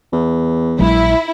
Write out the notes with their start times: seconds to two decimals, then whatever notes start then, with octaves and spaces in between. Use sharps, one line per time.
0.12 E2
0.79 A#1 F#3 G#3 E4